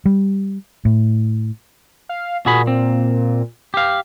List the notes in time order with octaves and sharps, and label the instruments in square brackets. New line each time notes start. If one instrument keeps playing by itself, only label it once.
[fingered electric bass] G3
A2
[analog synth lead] F5
[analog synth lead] A#2 [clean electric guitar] F#4 G#4 B5
[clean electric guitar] C4
G4 F5